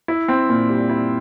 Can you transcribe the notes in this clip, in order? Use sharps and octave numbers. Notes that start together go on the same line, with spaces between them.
E4
C4
A#2
G3
E4